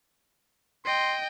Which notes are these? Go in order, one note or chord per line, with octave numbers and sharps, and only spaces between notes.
D#5 G5 C6